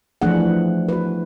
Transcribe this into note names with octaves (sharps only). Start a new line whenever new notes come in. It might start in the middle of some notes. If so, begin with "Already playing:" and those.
E3 F3 A3 D4 G#4 F#5
F#4 B4